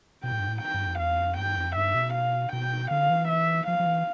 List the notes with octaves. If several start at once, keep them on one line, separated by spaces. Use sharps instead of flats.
B2 G5
A2
G2
A2
G5
G2
F2
E2 F5
F2
G2 G5
F2
G2 E5
B2
F5
B2 G5
D3 F5
E3
E5
F3 F5
F3
E3